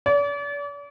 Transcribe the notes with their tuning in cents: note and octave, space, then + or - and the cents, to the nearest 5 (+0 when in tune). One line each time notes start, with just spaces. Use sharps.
D5 -40